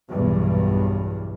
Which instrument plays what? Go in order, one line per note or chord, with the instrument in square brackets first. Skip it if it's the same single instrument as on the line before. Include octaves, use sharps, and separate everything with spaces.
[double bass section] B1 E2 G2